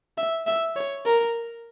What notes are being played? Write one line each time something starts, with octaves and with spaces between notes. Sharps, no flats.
E5
E5
C#5
A#4